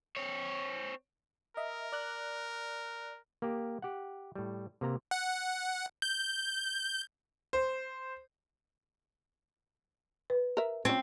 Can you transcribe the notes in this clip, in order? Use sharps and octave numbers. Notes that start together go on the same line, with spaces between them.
C4 C#5
A#4 D#5 E5
D5 F#6
A#3 G4
G4 F#5
A2 G3
C3 A#3 A#5
F#5
G6
C5
B4
A#4 E5
F3 C4 C#4